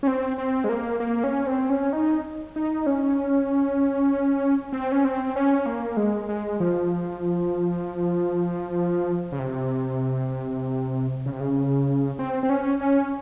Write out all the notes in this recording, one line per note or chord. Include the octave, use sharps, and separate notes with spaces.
C#4
C4
C4
G#3
A#3
A#3
C#4
C4
C#4
D#4
D#4
C#4
C4
C#4
C4
C#4
A#3
G#3
G#3
F3
C#3
C3
C#3
C3
C#3
C4
C4
C#4
C#4